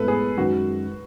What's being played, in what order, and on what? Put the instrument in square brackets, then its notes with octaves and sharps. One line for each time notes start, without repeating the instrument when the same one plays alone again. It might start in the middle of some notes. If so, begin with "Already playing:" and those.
Already playing: [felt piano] A2 G#3 B3 [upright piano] A4 B4
[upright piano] G#4
[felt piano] F#2 D#3 G#3 D#4 [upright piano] F#4